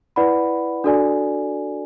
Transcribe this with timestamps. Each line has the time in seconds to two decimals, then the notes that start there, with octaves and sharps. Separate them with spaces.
0.16 E4 B4 D5 F#5 B5
0.84 D4 F#4 A4 D5 G#5